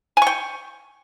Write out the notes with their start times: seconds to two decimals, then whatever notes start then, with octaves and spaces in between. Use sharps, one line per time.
0.17 G#5
0.22 C#6
0.27 G5